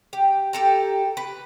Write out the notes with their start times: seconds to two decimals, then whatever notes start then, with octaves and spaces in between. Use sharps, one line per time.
0.13 G4
0.53 G4 A4 A#5
1.17 B4